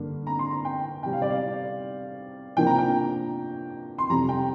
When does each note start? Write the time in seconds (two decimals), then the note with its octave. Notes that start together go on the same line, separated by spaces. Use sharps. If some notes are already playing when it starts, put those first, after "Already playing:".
Already playing: G2 D3 A#3 D4
0.27 A#5
0.39 C6
0.51 A#5
0.65 G5
1.03 C3 G3 C4 G5
1.13 F5
1.22 D5
1.30 F5
2.57 C3 F3 A#3 D4 G5
2.67 A#5
2.78 G5
3.98 C6
4.10 F2 C3 G3 A#5
4.29 G5